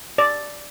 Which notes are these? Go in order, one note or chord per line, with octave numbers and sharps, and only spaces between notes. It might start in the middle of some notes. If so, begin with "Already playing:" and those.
D5